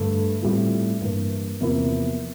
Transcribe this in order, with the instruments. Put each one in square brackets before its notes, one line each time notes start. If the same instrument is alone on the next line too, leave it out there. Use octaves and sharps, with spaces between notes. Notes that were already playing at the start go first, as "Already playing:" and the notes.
Already playing: [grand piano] G2 D3 A3
A2 G3 C4 F4
G2 E3 A#3
E2 C3 F3 A#3 E4